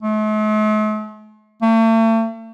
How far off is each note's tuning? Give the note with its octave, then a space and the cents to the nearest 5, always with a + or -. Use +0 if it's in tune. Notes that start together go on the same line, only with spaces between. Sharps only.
A3 -45
A3 +40